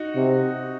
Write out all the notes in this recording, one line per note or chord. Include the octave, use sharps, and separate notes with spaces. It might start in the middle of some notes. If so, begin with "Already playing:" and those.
Already playing: D#4 F#4
C3